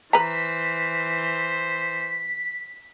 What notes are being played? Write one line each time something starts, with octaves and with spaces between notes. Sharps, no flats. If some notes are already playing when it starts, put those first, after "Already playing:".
E3 B4 C5 A#5 B6